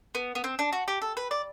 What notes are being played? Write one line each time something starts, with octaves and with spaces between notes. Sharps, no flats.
B3
B3
C4
D4
F#4
G4
A4
B4
D5